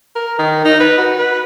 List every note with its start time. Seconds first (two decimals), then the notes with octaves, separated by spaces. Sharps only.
0.15 A#4
0.39 D#3
0.65 D#4
0.80 B4
0.98 F#4
1.18 B4